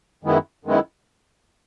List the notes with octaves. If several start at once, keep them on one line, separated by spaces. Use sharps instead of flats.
F#2 D#3 G#3 B3 E4
F#2 D#3 G#3 B3 E4